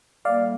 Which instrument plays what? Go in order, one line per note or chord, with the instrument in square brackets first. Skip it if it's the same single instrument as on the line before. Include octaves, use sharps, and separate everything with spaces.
[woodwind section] A2 G3 A#3 [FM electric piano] D5 F5